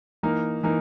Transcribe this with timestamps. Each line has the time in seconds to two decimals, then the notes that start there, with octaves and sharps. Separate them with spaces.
0.23 E3 A#3 D#4 A#4
0.63 E3 A#3 D#4 A#4